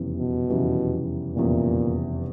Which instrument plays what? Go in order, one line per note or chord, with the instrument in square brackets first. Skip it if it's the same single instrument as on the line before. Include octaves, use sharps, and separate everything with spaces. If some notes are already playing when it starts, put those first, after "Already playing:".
Already playing: [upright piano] F1 E2 C#3 E3 G3
[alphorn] B2
[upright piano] F1 E2 C#3 E3 G3
[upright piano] F1 E2 C#3 E3 G3 [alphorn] A#2